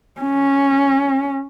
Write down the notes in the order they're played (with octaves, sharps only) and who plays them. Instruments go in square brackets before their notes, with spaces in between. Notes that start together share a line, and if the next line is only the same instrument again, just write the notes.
[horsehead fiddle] C#4